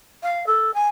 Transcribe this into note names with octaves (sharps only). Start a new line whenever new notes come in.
F5
A4
G#5